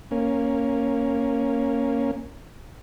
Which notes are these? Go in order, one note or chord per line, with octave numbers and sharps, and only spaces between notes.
A#3 C#4